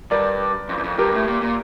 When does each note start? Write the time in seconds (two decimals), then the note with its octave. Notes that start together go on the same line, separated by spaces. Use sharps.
0.11 G2 A#4 D5
0.69 F2
0.78 E2
0.84 F2
0.98 G2 G4 A#4
1.12 A2
1.28 A#2
1.42 A#2